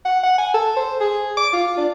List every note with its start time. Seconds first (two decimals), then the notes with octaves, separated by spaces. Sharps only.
0.05 F#5
0.23 F#5
0.38 G#5
0.54 A4
0.77 C5
1.01 G#4
1.37 D6
1.53 F4
1.78 D4